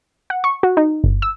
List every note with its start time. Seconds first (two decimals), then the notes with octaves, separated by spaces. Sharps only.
0.30 F#5
0.44 C#6
0.63 F#4
0.77 D#4
1.04 G1
1.22 E6